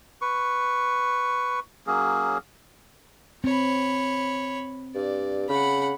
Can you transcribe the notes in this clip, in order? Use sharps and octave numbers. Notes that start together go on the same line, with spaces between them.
B4 C#6
F#3 A#3 C#4 G#4
C4 C#5 B5
G2 D5
C#3 F#5 B5